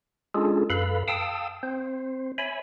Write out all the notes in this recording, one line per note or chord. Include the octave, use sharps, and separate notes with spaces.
G#3 C#4 D4 F4 G#4 A4
F#2 A4 B4 F5 B5
F5 G5 A5 D#6 E6
C4 C5
C#5 E5 G#5 B5